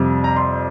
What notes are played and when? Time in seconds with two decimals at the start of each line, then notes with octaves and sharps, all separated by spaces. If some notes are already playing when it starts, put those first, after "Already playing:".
Already playing: F2 C3 G3
0.24 A#5
0.36 C6